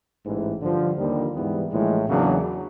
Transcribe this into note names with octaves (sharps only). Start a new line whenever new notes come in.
A1 G#2 E3
G2 D3 F3
D#2 D3 G3 A#3 D#4
G#2 E3 G3 B3
A#1 A2 E3 G#3
E2 C#3 F#3 A#3 D4